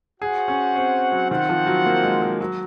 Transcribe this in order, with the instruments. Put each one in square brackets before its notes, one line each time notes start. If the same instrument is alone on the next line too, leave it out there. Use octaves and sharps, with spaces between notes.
[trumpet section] F#4 C5 F#5 [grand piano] G#4
[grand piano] C#4
C4
F#3
[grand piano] D#3 [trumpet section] C4 F4 C5 F#5
[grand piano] F3
F#3
A#3
G#3
G#3
F#3